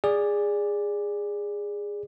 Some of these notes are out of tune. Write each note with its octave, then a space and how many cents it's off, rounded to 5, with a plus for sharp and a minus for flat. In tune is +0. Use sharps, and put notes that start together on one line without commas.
G#4 -15 D5 +0